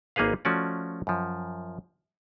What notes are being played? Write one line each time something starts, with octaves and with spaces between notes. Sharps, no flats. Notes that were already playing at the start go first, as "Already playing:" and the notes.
G#1 A#3 D#4 G#4 B4 F5
F3 A3 C#4 F#4 D5
F#2 F3